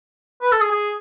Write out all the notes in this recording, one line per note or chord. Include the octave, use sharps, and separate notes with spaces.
B4
A4
G#4
G#4